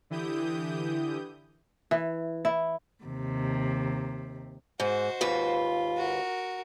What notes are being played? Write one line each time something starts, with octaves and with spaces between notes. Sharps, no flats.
D3 E3 E4 G4 D#6 G6
E3
E4
D#2 C3
G#2 F#4 C5
D#2 G#2 F4 B4
F#4 A#4